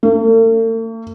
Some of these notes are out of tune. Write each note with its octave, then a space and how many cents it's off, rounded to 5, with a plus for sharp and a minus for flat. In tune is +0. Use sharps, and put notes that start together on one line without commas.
A3 +45